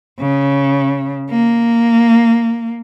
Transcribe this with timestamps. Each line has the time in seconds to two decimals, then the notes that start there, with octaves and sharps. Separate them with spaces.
0.20 C#3
1.31 A#3